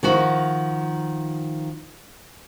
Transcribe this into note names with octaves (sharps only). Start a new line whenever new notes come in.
D#3 F3 F#4